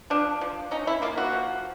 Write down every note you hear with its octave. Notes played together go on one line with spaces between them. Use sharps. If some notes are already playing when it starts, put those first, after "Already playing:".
F3 D4
F3
C#4 D#4
E4
A#3 F4
F#4
F3